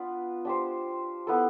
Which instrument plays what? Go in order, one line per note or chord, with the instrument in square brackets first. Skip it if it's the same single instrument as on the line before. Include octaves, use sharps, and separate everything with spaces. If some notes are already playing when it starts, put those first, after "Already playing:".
Already playing: [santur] B3 D4 F4 B4
D4 G4 C5
B3 E4 A4